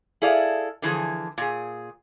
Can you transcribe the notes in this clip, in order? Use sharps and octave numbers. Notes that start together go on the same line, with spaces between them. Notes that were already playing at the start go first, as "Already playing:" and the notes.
E4 G#4 A4 D5 F5
D3 E3 F3 G#4
A#2 G#4